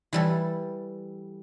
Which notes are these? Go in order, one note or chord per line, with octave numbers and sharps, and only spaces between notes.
E3 G3 A4